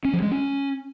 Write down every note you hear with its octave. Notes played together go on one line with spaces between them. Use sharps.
C#4
F3
G#3
C#4